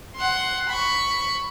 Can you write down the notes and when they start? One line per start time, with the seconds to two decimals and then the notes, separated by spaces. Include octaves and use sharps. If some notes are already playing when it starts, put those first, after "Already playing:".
0.16 F#5 C6
0.69 B5 C#6